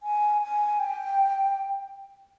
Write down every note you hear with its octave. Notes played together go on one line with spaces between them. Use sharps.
G#5
G#5
G5